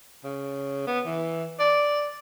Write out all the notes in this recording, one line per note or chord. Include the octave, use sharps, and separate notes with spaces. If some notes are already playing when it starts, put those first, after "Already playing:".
C#3
B3
E3
D5